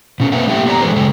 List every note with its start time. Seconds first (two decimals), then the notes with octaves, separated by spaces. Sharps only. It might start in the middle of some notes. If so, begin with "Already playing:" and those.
0.20 B2 C#4
0.32 A#3 C4 B4 C5 E5 F#5
0.48 A3 A#3 E4 G4 E5 G5
0.66 B3 G4 C5 D5 A#5
0.81 E3 G#3 A4 B4 C5
0.96 C#3 G#3 A4